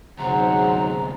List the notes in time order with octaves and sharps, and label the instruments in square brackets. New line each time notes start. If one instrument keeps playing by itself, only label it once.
[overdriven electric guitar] D2 C3 [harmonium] G#2 F#3 [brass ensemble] G#4 C5 F#5 [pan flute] A#5